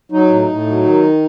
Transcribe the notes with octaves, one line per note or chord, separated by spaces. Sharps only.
F#3 D#4
A2
A2
F#3
D#3